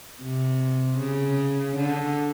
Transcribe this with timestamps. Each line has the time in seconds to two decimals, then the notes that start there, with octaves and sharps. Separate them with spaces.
0.21 C3
0.98 C#3
1.77 D3